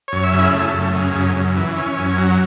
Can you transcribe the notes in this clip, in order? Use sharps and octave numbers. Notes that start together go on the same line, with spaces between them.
F#2 C#5
E5
C#3
E4
A3
F#2
C#3
F#2
F#2
E3
C#4
F#2
F#3